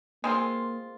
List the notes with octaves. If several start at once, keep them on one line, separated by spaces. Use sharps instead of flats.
G#3 A#3 C4 F4